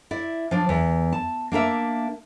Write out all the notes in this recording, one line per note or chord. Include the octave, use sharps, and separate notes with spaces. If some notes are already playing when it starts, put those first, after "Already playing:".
E4 D5
F3 D4
E2
A5
A#3 D4 A#4 E5